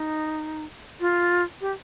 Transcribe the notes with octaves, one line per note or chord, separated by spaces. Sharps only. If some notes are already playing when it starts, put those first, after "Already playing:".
Already playing: D#4
F4
G4